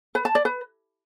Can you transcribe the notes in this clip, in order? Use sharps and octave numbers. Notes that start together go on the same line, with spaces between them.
B4
A5
D5
B4